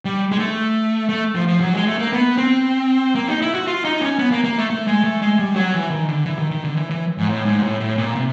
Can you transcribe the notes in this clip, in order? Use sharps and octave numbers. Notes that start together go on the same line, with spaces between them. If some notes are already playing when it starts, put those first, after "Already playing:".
G3
G#3
A3
A3
F3
F3
F#3
G#3
A3
A#3
B3
C4
A#3
D#4
E4
F#4
F4
D#4
C#4
B3
A#3
A#3
A3
A3
G#3
A3
G#3
G3
F#3
E3
D#3
D3
E3
D#3
D#3
D3
E3
E3
G#2
A2
G#2
A2
A2
A#2
C3